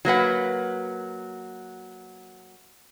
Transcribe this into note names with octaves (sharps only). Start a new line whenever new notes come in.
F#3 A#3 B4 F#5